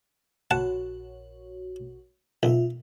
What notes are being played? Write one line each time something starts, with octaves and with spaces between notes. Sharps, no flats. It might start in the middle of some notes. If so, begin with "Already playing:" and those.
A#1 F#4 C#5 F#5 A5
B1 F4 E5